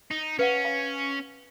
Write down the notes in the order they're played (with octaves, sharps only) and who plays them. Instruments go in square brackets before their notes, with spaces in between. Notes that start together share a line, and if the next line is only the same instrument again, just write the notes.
[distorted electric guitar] D#4
[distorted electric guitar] C#4 [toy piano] B4 F5 F#5
[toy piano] F5